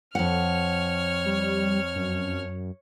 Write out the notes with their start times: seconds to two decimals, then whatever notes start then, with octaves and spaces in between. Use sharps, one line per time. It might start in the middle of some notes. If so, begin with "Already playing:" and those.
0.15 F2 C#5 F#5 F6
1.26 G3
1.96 F#2